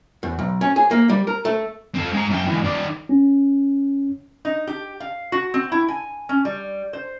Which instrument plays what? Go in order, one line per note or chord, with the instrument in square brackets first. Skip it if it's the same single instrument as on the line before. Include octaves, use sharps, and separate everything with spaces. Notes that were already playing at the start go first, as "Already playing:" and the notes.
[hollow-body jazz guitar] E2
B1
C#4
G#4
A#3
G3
A#4
A3
[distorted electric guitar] C4 A4
G#3 A#5
F#2 G5
E3 G#3
D#3 D5
[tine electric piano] C#4
[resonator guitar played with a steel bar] D#4
G4
F5
F#4
C4
E4
G#5
C#4
G3
C5